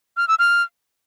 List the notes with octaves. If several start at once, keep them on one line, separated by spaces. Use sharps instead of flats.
F6
E6
F6